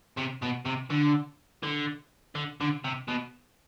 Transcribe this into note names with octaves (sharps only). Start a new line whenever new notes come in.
C3
B2
C3
D3
D3
D3
D3
C3
B2